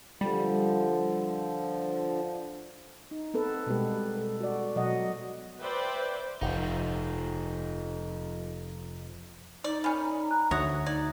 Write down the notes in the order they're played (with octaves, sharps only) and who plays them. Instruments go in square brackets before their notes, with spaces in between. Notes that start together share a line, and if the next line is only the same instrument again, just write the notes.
[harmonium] D3 F3 [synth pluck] G3
[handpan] D#4
B3 C4 A4 B4
B2 G3 G#3 B3 G4 B4
A4
F#4 D5
B2 F#3 D#5 F#5
[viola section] B4 C5 D5 E5 G5
[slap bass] F1 [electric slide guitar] F3 D#4
[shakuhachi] D#4 [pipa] D5
[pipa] D#3 C#4 [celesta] D5 G#5 B5
[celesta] A#5 F#6
[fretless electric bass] D2 [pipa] C#5 F#5 [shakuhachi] E5 [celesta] D#6 A#6
[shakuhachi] D#4 [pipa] D5 [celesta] G#6